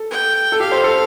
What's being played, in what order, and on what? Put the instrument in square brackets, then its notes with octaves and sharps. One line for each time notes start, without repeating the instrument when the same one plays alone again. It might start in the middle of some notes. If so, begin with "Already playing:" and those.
Already playing: [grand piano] A4
[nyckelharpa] G5
[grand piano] A4
[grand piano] G4 [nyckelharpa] F5
[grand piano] C5
A4